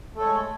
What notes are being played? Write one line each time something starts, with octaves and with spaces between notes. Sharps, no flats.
G#3 A3 A4 C#5